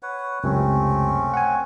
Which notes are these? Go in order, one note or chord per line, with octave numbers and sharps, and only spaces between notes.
B4 C#5 F#5
C#2 F#2 C3 A3 C4 C#4
F#5 G#5